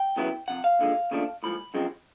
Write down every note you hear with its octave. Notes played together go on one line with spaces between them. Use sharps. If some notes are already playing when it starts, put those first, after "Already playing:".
Already playing: G5
E2 C#3 F#3 B3 E4
F2 C3 F#5
F5
D#2 D3 F3 G#3
D#2 C#3 F3 A3 D4
A2 F3 G#3 B5
F#2 C#3 F3 G#3 C4